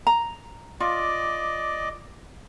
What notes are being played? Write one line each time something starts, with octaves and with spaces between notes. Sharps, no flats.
A#5
F4 D5 D#5 D6